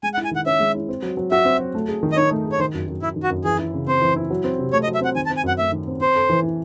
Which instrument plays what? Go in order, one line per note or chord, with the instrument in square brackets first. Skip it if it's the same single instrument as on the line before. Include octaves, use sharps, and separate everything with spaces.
[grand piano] G#3 [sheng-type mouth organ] G#5
[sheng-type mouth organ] F#5
[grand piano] E4
[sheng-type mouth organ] G#5
[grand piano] D#3 [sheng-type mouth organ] F#5
[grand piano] C#4 [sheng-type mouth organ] E5
[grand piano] G#3
E4
C4
F#3
F#3
[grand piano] F#4 [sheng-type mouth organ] E5
[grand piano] C4
F#3
A3
G#4
D#3
[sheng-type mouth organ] D#5
[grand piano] D#4 [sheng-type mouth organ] C#5
[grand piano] A3
G#4
[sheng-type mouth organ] C#5
[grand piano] D#3 [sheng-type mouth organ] C5
[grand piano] F#2
F#2
[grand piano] F#3 [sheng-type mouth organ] E4
[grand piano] D#3
[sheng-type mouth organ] F#4
[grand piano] F#2
[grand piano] E3 [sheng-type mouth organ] G#4
[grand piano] E4
C#3
[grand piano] C4 [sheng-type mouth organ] C5
[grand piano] E3
E4
F#3
C4
C3
[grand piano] A3 [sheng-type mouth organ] C#5
[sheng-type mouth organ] D#5
[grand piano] F#3
[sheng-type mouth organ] E5
[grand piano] C4 [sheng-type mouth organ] F#5
[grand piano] D#3 [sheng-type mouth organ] G#5
[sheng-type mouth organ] A5
[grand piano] C4
[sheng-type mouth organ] G#5
[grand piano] F#2 [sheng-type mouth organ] F#5
[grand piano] A3 [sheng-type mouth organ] E5
[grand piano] D#3
C4
[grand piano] C4 [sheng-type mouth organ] C5
[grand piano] A4
E3
E4